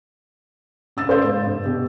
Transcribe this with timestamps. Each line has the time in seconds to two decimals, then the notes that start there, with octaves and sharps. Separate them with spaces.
0.97 C#4 E6 A6
1.09 C5 D5 F5 G6
1.24 G#2
1.47 G2
1.65 B2 G4